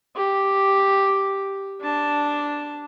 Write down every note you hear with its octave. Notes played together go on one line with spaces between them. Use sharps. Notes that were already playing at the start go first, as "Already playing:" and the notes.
G4
D4 A5